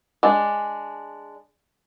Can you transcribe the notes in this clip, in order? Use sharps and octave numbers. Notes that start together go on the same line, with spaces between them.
G#3 D4